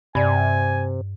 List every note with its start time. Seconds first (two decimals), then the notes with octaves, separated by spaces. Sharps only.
0.15 G2 C3 D5 G#5